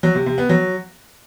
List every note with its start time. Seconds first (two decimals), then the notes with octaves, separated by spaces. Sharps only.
0.03 F#3
0.15 C3
0.26 C3
0.38 B3
0.49 F#3